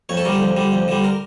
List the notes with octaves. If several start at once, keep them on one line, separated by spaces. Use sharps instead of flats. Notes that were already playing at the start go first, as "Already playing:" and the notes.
F2 C#5
A4
D3 G3 A#4
F2
D3 G3
F2
D3 G3
A#4